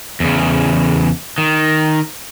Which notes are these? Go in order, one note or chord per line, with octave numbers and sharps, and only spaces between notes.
E2 C#3
D#3